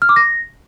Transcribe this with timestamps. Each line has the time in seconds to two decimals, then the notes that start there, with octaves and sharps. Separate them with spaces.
0.02 F6
0.09 D6
0.16 A#6